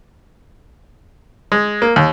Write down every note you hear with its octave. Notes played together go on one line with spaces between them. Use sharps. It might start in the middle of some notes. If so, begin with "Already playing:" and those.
G#3
A#3
D#2